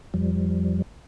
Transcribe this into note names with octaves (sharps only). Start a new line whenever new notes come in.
F2 F3 G3